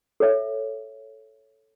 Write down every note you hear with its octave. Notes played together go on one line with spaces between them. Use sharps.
A4 C#5 E5